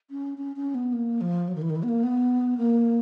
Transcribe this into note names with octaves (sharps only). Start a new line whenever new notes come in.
C#4
C#4
C#4
B3
A#3
F3
F#3
D#3
E3
D#3
E3
B3
A#3
B3
A#3